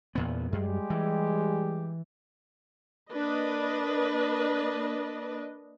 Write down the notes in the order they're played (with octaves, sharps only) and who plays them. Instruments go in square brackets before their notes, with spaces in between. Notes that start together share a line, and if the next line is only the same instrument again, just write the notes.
[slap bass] E2 A#2 B3
[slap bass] F#2 [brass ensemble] G3 G#3 G4
[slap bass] E3
[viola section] A#3 D4 B4 D#5